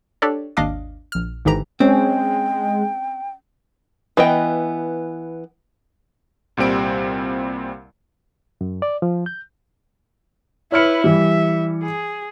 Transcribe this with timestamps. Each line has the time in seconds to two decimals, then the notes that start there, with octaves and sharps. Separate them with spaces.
0.22 D4 G4 A4 C#5 D5
0.57 G#1 D#2 D4 D#5 F5 D6
1.12 A#1 F6
1.45 G#1 G#2 D3 E3 G4 A#5
1.80 G#3 C4 C#4 G5
4.17 E3 B3 D#5 G5
6.57 C2 A#2 G3 C4 D7
8.61 F#2
8.82 D5
9.02 F3
9.26 G6
10.72 E4 B4 C#5 F6 C#7
11.04 E3 G3 E5
11.83 G#4